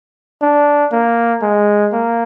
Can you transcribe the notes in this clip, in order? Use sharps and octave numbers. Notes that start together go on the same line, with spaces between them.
D4
A#3
G#3
A#3